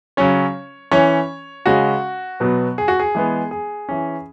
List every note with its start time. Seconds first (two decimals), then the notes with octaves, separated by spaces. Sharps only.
0.17 C#3 F#3 C#4 C#5
0.91 E3 C#4 C#5
1.66 C#3 G#3 C#4 F#4
2.40 B2 F#3 B3
2.78 G#4
2.88 F#4
2.99 G#4
3.15 E3 G#3 B3
3.51 G#4
3.89 E3 C#4